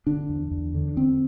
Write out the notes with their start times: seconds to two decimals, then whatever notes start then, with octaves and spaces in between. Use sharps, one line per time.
0.07 D3 D4
0.29 E2
0.51 E2
0.75 D3
0.97 D3 C4